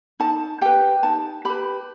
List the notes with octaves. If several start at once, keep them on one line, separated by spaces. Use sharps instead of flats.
D#4 A5
G4 B4 G5
D#4 A5
G4 B4 B5